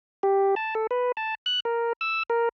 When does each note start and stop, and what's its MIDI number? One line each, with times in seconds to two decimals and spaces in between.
0.23 0.55 67
0.56 0.74 81
0.75 0.87 69
0.91 1.12 71
1.17 1.35 81
1.46 1.60 90
1.65 1.93 70
2.01 2.23 88
2.30 2.49 70